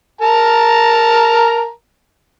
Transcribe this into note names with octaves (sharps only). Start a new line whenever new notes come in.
A#4 A5 A#5